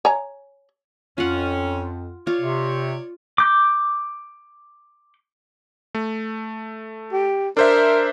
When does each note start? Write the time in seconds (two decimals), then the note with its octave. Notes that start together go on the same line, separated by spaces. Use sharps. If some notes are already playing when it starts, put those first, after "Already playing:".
0.05 C#5 G#5 A#5
1.18 F2 C#4 F4 F#5
2.27 F4 C#5 D5
2.41 C3
3.38 D6 G6
5.95 A3
7.12 G4
7.57 D4 A#4 C5 E5